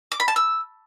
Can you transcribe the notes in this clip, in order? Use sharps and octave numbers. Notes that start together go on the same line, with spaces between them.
D6
B5
A5
E6